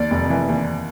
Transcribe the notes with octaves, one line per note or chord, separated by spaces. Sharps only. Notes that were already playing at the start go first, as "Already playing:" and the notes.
Already playing: D#2 D5
F1
E3
D#2